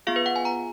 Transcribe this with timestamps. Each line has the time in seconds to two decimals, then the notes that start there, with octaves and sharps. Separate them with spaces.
0.07 B3 F4 G#4 F5
0.16 B4
0.26 F#5
0.36 G#5
0.45 A#5